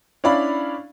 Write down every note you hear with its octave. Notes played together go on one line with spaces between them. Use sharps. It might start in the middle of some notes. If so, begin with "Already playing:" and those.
C#4 D4 E4 D5 F5 B5